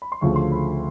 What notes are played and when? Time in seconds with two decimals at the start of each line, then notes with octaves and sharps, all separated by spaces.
0.02 B5
0.12 C6
0.21 D2 C#3 F3 A3 C#6
0.36 C6
0.52 B5